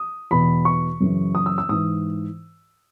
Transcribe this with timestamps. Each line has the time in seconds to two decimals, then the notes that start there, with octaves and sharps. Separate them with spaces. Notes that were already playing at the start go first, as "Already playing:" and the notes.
Already playing: D#6
0.31 E2 B2 B5
0.65 C#6
1.00 F#2 C#3 E3
1.35 D#6
1.46 E6
1.58 E6
1.69 G#2 E3 D#6